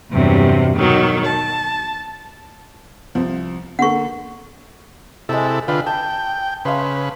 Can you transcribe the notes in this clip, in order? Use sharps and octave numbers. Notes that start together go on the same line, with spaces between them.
E2 G2 C3 F#3
B2 D#3 F#3
A5
C2 F3 C4
D3 A#3 A4 F#5 C#6
C3 G#3 E4 A4 E6
D3 F4 B4 G5 E6
G5 A5
C#3 B4 E5 F5 C6